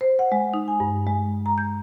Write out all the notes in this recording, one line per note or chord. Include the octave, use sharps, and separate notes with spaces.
C5
F#5
G#3
D#4
G#5
G2
G#3
A#5
G6